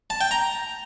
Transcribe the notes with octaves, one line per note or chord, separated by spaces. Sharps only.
A5
G5
A#5